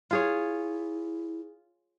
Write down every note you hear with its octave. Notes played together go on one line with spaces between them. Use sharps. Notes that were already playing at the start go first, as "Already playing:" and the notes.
E4 F4 G#4 C#5